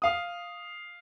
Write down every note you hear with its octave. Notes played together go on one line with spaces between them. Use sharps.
F5 D#6